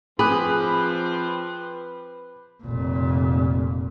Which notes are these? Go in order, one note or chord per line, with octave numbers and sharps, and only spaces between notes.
F3 C4 G#4 B4 B5 D6 F#6
F1 A#2